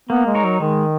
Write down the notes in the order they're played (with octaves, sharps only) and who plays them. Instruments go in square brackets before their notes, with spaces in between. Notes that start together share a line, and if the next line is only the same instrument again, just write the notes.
[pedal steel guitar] A#3 [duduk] B3
[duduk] G#3
[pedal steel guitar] D#4 A#4 C#5
[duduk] F#3
[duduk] D#3 [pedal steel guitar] G#3